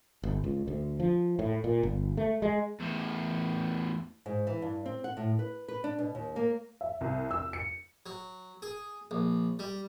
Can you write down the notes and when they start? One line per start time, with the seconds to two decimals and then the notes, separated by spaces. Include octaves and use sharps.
0.24 G1
0.44 C#2
0.68 D2
1.00 F3
1.39 A2
1.64 A#2
1.83 G1
2.17 A3
2.42 G#3
2.80 E2 A2
4.26 G#2
4.47 E3
4.62 G2
4.86 C4
5.04 F#5
5.17 A2
5.39 B4
5.68 B4
5.84 D4
5.99 B2
6.15 D#2
6.36 A#3
6.81 E5
7.01 C2
7.31 E6
7.53 C#7
8.06 F#3
8.62 G#4
9.11 A#1
9.59 G3